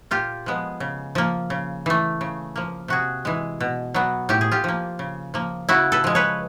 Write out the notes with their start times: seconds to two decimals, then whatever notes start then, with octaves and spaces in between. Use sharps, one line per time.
0.11 A#2 F4 G4
0.46 F3 G#3 B3
0.80 C#3
1.15 F3 A#3
1.50 C#3
1.86 E3 A3
2.21 C#3
2.56 F3 A#3
2.88 C3 F#4 G#4
3.25 E3 G#3
3.60 B2
3.94 F#3 B3
4.29 A2 G4
4.41 G#4
4.52 F4 G4
4.64 F3 A#3
4.99 C#3
5.34 F3 A#3
5.69 C#3 E4 F#4
5.92 A4 B4
6.04 F3 G#3
6.15 B4 C#5